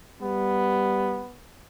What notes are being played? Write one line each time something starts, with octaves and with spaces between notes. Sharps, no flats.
G3 B3